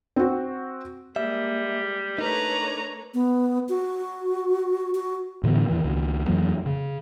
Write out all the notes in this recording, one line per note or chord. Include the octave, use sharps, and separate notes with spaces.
C4 F#4
G3 G#3 A#3 E5
A3 D4 D#4 A#4 B4 C#5 A#5
B3
F#4
F#4
A2 D3 E3 B3
E2 C3 D#3 E3
C#2 D#3
F2 E3 F#3 A#3
C#3